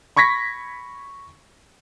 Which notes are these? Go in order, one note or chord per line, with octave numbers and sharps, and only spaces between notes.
B5 C#6 G#6 A#6 B6